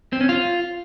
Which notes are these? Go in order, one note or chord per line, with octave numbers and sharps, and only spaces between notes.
C4
C#4
F4